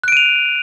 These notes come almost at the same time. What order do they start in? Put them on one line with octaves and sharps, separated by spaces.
F#6 D7 D#7 F7